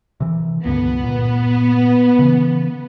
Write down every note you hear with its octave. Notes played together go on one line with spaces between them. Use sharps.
C3 E3
C#2 G2 D3 B3
A#2
C#3 E3